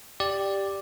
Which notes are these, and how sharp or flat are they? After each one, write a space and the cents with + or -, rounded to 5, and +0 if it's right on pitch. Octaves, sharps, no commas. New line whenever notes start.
G4 +0 D5 +0